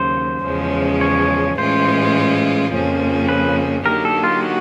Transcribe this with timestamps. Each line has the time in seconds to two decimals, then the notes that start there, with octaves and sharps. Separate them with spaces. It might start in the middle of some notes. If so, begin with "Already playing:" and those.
Already playing: D#2 C#3 F#3 C5
0.44 E2 C#3 F3 G#3 C#4
1.01 C#5
1.58 A2 E3 G#3 C#4 F4 C5
2.72 F2 C#3 F3 A#3 C#4
3.29 B4
3.86 D3 F#3 A#3 D#4 G4 A#4
4.05 A4
4.24 F4
4.43 F#4